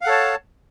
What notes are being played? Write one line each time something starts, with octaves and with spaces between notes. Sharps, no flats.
A4 C#5 F5 F#5 A5